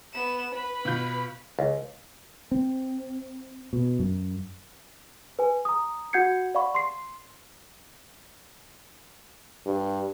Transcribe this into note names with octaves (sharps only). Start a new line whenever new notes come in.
B3 E7
B4 B5
B2 F4 G6
C#2
C4
B2
F#2
B4 G#5
A#5 D#6
F#4 F#5 G6 G#6 C7 C#7
D5 F5 F#5 B5 C#6
C6 C7
G2